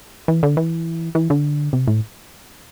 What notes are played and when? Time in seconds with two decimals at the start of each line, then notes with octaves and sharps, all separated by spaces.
0.28 E3
0.43 D3
0.57 E3
1.15 E3
1.30 D3
1.73 C3
1.87 A2